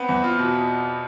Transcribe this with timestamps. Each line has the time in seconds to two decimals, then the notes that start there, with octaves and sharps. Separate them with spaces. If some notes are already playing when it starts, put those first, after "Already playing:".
Already playing: B3 C4
0.09 E2
0.24 F4
0.39 B2